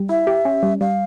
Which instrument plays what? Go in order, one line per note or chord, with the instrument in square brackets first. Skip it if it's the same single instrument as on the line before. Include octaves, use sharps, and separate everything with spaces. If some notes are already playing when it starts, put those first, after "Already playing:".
Already playing: [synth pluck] G3
[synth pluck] E4 [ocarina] E5
[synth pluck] G4
C#4
G3
[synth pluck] G3 [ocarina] F5